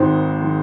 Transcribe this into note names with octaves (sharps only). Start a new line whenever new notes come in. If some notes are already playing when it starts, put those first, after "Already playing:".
Already playing: G#1 G#2 D#3 C5
D#3